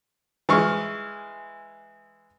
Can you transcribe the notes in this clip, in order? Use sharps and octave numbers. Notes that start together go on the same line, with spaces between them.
E3 G#3 C#6 F6